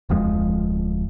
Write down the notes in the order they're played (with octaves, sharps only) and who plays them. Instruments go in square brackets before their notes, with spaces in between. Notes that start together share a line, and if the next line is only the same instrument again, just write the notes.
[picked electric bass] D1 F2 F3 G#3